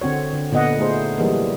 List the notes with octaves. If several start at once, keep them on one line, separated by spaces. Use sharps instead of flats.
D3 C4 F#4 C#5
D3
A#2 D3 B3 D#5 F#5
A3 D#4 G#4 C5
E3 F#3 G3 A#3 D#4 G#4